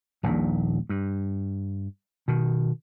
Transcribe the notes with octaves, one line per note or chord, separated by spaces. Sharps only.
D#1 A#1 D#2 A#2
G2
B2 D#3